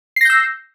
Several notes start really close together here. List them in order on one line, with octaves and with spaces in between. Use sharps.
C7 A#6 G6 E6